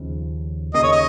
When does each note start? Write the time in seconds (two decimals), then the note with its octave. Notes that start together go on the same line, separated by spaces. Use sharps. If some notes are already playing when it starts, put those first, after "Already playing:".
Already playing: D#2 C#3 F3 C#4
0.74 D#2 C#3 A#3 D#5
0.83 C#5
0.92 D#5